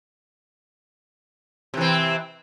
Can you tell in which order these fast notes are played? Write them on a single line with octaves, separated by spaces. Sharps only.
C3 E3 C4